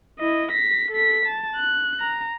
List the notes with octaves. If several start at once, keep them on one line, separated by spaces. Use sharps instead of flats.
E4 D#5
A#6 B6
A4 B6
A5
F#6
A#5